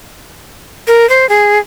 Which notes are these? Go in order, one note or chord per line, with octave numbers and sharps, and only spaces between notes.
A#4
C5
G#4